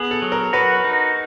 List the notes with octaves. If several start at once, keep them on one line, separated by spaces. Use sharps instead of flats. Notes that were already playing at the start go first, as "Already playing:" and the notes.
Already playing: B3 G#4
A4
F#3
A#4
F#4 B4
D#4